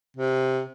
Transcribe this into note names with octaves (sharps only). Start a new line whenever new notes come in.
C3